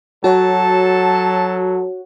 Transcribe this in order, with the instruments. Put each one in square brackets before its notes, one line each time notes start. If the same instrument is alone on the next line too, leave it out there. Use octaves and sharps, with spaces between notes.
[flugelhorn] F#3 [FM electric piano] F#4 C#5 F#5 [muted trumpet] A4 [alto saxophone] A5